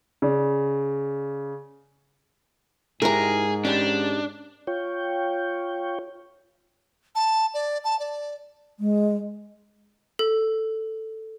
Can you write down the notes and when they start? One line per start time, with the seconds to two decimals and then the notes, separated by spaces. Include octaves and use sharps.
0.22 C#3 D5
3.02 G#2 G#3 E4 G4 G#4 A#4 A#5
3.65 C#4 D4 G4 A5
4.67 F4 C#5 G5
7.15 A5
7.54 D5
7.84 A5
7.99 D5
8.80 G#3
10.19 A4